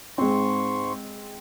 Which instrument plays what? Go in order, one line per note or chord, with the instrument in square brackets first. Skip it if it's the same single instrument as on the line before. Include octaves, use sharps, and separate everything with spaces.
[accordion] G#2 C6 C#6 [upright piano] G#3 C4